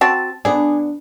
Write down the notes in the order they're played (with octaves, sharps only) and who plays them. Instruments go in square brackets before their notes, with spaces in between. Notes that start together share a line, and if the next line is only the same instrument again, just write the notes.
[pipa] C4 F#4 A5
[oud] B3 D4 [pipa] G#4